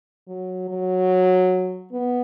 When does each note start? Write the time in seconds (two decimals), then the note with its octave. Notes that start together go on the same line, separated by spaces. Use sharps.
0.27 F#3
0.69 F#3
1.92 B3